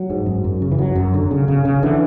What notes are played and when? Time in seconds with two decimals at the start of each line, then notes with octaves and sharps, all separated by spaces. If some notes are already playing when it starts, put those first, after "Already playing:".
Already playing: F#3
0.10 G#2
0.26 F#2
0.44 F#2
0.62 C#3
0.72 E3
0.78 F#2 F#3
0.95 F#2
1.14 D3
1.31 C#3
1.48 C#3
1.65 C#3
1.83 D3 E3